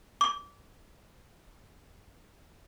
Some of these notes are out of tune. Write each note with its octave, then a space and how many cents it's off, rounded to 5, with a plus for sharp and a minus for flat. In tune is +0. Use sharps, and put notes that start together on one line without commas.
D6 -25